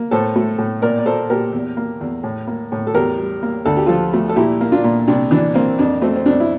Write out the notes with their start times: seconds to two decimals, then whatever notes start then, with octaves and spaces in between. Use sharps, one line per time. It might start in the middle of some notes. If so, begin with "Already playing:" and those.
Already playing: A#3
0.11 A2 A4 C5
0.36 A3
0.58 A2
0.82 A#2 A#4 D5
0.98 D5
1.06 A#3 A4 C5
1.30 A#2 G4 A#4
1.53 E2
1.77 A#3
2.01 E2
2.23 A2
2.47 A#3
2.72 A2
2.87 A4
2.95 E2 G4 A#4
3.18 G3
3.43 A#3
3.65 D2 A4
3.77 G4
3.86 F3 F4 A4
4.14 A3
4.29 A4
4.36 A#2 E4 G4
4.61 A#3
4.72 D4 F4
4.84 A#2
5.07 C2 D4
5.31 E3 D4
5.54 A#3 C4
5.79 F2 D4
6.02 A3 C4
6.16 C4
6.26 F2 D4
6.40 E4